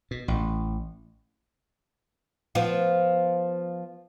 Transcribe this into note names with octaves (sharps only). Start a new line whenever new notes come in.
B2
A1
F3 B3